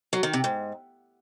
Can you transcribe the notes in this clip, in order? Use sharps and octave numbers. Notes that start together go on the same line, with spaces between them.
F#3
D#3
C3
G#2